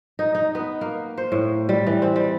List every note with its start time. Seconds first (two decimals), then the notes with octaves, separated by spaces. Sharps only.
0.19 D#4
0.35 D#4
0.55 B3
0.81 A#3
1.18 C5
1.32 A2
1.69 G3
1.86 E3
2.02 C4
2.16 G3